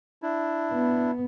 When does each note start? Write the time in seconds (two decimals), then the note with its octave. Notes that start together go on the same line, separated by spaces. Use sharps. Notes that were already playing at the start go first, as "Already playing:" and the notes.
0.22 D4 E4
0.72 B3